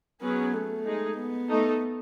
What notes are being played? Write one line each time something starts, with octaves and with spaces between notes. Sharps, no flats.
F#3 B3 C#4 G#4 B4
A3
G#3 D#4 G#4
B3
A3 D#4 A4